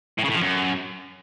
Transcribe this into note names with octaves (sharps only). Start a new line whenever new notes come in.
A2
C#3
A2
F3
F#2